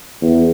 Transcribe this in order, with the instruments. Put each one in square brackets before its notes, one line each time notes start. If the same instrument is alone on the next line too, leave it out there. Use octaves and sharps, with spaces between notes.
[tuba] E2